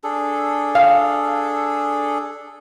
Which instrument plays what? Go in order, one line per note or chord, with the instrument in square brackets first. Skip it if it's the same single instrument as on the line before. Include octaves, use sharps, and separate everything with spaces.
[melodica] D4 G#4 A4
[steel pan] F5